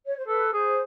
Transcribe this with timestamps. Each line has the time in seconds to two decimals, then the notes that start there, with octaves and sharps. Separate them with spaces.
0.05 C#5
0.17 C5
0.27 A4 B4
0.53 G#4 C5